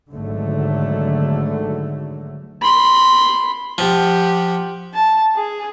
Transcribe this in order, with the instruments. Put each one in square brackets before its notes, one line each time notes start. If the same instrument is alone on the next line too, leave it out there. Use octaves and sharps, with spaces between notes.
[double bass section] G#1 D3 F#3 A3
[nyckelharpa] B5 C6
[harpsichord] F3 [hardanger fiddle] G4 F#5
[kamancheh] A5
G#4